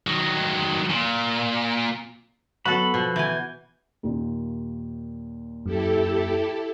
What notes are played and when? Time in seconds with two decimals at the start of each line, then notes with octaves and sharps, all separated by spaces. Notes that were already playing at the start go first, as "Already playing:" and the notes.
0.07 D#3 F#3
0.90 A#2
2.65 F#3 B3 F#4 A4 B5
2.94 B2 F3
3.16 E3 G#5 G6
4.03 D#2 A#2
5.66 F#2 E4 G4 A4